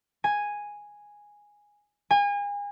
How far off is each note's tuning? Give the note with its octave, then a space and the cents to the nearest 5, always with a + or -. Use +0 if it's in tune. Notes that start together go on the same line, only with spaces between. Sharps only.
G#5 -5
G#5 -35